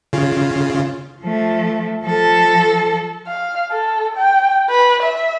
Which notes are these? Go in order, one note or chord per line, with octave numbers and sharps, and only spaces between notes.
C#3 F4
F3 A3
F3 A4
F5
A4
G5
B4
E5